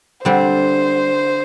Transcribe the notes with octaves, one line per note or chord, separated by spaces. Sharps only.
D3 G3 C4 C5